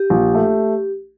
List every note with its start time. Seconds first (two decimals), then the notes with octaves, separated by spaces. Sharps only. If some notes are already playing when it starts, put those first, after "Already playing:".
Already playing: G4
0.10 A#1
0.34 A3